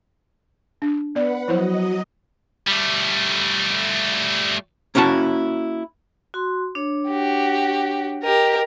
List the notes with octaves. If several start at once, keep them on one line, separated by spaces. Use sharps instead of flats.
D4
B3 B4 D5 F#5
F3 F#3 E4 C5 D#5
G3 A3
A#3 C#4 E4 F#4 A5
F#4 C6
D4 C#5
F#4 G4
G4 A#4 D#5